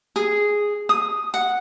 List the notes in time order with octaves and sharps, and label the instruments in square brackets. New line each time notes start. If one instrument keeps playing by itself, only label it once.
[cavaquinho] G#4
D#6
F#5